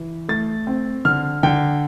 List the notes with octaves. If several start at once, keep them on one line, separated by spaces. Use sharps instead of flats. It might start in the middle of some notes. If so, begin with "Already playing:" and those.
Already playing: E3
A3 A6
C4
D3 F6
D3 G5